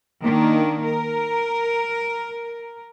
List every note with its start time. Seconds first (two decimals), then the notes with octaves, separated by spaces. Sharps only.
0.24 D#3 A#3 D4
0.84 A#4